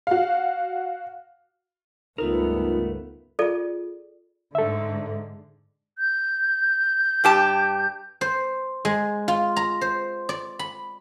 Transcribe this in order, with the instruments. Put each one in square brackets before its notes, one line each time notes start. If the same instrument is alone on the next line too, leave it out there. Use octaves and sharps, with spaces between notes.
[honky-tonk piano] F#4 F5
[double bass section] C#2 G2 B3 [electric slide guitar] A3 A#4 [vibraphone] D#4 F4
[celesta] F4 G#4 [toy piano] A4 D5
[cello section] G#2 D3 [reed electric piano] A4 E5
[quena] G6
[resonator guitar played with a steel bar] G2 G4 A5
[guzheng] C5
G#3
F4
A#5
C5
D5
B5